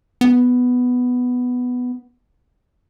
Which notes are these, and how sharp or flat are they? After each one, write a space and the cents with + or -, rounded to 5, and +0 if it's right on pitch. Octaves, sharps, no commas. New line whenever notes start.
B3 +5